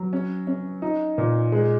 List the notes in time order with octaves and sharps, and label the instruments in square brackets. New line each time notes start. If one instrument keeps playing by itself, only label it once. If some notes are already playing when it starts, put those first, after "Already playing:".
Already playing: [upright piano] F#3
C#4
C#4
D#4
A#2
G#3